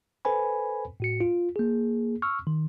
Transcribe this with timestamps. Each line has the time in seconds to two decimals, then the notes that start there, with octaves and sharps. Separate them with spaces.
0.25 A4 B4 C5 G#5 B5
1.00 A2 F#4 C#7
1.21 F4
1.56 A#3 G#4
2.22 C#6 E6 F6
2.47 D#3